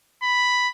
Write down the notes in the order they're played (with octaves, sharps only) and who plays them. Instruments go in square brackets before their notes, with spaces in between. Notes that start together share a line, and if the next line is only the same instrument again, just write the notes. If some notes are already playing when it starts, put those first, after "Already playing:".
[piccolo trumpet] B5